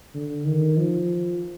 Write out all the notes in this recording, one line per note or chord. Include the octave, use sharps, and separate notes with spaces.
D3
D#3
F3